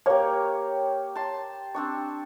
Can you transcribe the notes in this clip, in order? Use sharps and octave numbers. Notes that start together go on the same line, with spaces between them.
A#3 G4 C#5
A5 C6
C4 D4 C#6